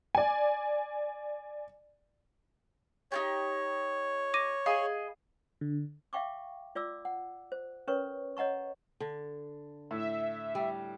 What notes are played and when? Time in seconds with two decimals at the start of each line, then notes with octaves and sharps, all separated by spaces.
0.15 D5 G#5
3.12 D#4 F4 G4 C#5
4.34 D6 A#6 D#7
4.66 G#4 D#5 F5 B5
5.61 D3
6.13 E5 F5 G5 C#6 D6
6.75 F4 D5 D6 E6
7.05 F#5
7.52 C5
7.87 C#4 A#4 B4 C#5 C#6
8.37 C#5 D#5 F#5 A#5 C#6
9.00 D3
9.91 A2 E5
10.55 G3